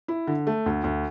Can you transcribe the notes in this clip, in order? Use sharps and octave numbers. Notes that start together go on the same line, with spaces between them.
E4
D3
A3
D2
D2